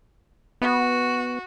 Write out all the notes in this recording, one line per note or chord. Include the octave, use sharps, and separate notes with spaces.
B3 F#4